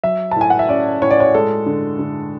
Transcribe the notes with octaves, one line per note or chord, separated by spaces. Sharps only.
F#3 E5
A5
A2 G#5
F#5
E5
C#4 D5
A2 C#5
D5
C#5
G#3 A4
D3
D3